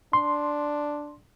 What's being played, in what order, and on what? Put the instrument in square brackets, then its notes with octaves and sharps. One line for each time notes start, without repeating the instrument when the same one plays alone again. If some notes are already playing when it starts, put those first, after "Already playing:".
[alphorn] D4 [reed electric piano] C6